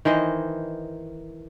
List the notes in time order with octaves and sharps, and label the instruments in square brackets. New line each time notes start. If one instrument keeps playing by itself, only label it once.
[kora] D#3 E3 C5 D#5